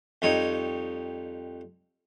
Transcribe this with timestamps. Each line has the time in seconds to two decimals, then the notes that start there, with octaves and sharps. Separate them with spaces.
0.22 F2 G3 D#4 C#5